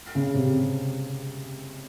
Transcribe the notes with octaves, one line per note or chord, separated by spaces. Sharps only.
C#3
C3